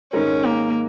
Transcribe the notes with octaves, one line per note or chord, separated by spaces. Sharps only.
G#2 D#3 G#3 C#4 D#4 A#4
A#3